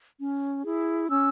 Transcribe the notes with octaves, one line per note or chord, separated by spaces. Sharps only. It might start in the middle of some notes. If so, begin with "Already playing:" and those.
C#4
E4 G#4
C#4 E6